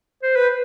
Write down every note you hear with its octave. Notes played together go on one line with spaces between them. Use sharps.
C5
B4